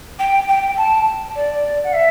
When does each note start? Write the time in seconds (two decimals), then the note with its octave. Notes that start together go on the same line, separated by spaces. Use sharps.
0.19 G5
0.48 G5
0.77 A5
1.35 D5
1.84 F#5
1.93 E5